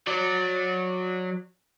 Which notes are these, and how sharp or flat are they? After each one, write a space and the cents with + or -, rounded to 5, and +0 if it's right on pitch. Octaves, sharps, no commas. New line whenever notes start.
F#3 -20 D5 +0